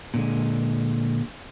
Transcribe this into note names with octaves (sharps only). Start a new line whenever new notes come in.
A#2 D3 G#3